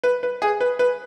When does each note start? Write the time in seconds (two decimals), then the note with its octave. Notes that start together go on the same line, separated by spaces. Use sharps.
0.04 B4
0.23 B4
0.42 G#4
0.61 B4
0.79 B4